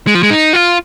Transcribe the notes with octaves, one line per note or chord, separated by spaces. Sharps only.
G#3
F3
G#3
D#4
F4